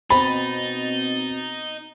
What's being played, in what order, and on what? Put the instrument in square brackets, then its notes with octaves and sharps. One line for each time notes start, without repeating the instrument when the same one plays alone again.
[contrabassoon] B2 [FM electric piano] C4 A6 [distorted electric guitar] D#4 [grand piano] B5